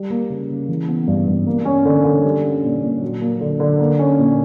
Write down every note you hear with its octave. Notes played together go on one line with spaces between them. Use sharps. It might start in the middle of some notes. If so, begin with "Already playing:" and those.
Already playing: G3
A#3
C#3
C#3
E3
B3
G2
G2
A#3
C#4
D3
D3
G3
C#4
A#2
A#2
F#3
A#3
D3
D3
A#3
C#4
A#2